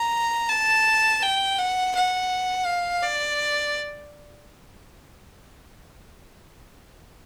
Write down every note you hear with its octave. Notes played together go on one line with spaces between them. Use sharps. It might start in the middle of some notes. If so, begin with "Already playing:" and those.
Already playing: A#5
A5
G5
F#5
F#5
F5
D5